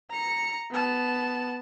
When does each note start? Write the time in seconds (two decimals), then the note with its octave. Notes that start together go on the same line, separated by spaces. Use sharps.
0.11 A#5 C#7
0.71 B3 A5